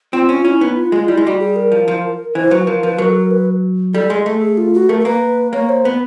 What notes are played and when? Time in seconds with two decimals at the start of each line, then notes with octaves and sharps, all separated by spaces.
0.13 C4 F4
0.29 C#4 F4
0.44 C#4 E4
0.61 B3 D#4
0.76 F4
0.92 G#3 F4
1.08 G3 E4
1.17 G#3
1.25 G3 F#4
1.39 G#4
1.56 A#4
1.72 F3
1.88 F3
2.35 E3 C5
2.51 F#3 B4
2.67 F3 A#4
2.83 F3 B4
2.98 F#3 A#4
3.10 A4
3.15 A#4
3.31 B4
3.94 G3 A4
4.10 G#3 G#4
4.26 A3 A4
4.42 G#4
4.58 F4
4.74 F#4
4.89 A3 A#4
5.00 A#4
5.05 A#3 B4
5.53 A#3 C#5
5.69 C5
5.85 B3 B4